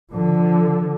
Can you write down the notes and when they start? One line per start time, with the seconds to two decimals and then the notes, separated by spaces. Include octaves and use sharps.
0.11 D3 F3